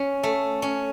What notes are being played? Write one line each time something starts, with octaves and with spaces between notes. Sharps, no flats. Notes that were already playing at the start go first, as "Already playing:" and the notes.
Already playing: C#4
A3
C#4